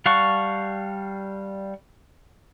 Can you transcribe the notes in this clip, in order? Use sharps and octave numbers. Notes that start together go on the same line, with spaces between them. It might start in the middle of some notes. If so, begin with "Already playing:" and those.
G3 F5 F#5 A5 C#6